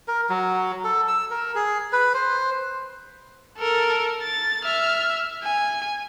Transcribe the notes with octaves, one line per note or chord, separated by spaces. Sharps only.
A#4
F#3
A4
E6
A#4
G#4
B4
C5
A4 A#4
A6
E5 F6
G#5